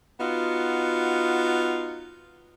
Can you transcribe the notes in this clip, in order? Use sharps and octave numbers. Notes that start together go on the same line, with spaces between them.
B3 D#4 F4 F#4